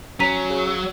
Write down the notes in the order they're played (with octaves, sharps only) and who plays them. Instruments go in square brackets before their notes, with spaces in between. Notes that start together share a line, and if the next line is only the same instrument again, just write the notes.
[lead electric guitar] F#3 [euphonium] C#4 [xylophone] A#5 B6 D#7
[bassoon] C#3